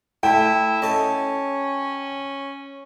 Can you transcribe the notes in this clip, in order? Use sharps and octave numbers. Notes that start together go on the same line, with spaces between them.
A3 E4 G5
C#4 A4 D#5